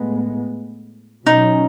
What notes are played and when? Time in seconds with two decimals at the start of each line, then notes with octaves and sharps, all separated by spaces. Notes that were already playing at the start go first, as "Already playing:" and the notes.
Already playing: A2 G#3 B3
1.25 B2 F#3 C#4 D#4